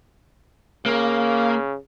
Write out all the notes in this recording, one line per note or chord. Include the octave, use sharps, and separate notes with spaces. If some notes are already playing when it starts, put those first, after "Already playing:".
C#3 A#3